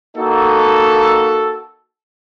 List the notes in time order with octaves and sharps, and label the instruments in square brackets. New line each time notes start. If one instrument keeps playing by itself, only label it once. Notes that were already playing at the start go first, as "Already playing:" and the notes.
[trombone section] A#3 D#4 F#4 [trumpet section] A4